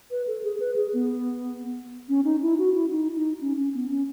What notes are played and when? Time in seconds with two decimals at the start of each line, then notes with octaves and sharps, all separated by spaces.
0.11 B4
0.27 A4
0.43 G#4
0.60 B4
0.76 G#4
0.93 B3
2.09 C#4
2.25 D#4
2.42 E4
2.58 F#4
2.74 E4
2.91 D#4
3.15 D#4
3.41 C#4
3.57 C#4
3.74 B3
3.90 C#4